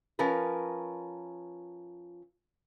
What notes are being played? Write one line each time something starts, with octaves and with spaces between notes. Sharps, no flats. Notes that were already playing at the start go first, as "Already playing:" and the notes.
F3 C#4 A#4 B4